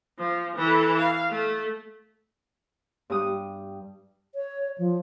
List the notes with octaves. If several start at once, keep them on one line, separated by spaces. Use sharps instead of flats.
F3
E3 A4
F5
A3
G2 G4 D#6
C#5
F3